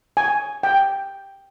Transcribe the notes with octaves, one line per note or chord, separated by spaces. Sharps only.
G#5
G5